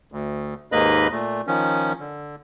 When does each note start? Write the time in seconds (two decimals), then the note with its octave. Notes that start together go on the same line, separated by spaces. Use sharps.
0.12 D2
0.72 D#2 G#2 A#3 B4 D#5 B5
1.12 A#2 A3
1.47 D#3 F3 C#4
2.00 D3